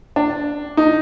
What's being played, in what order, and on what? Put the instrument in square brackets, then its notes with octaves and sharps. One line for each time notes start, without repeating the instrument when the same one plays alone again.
[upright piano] D4
D#4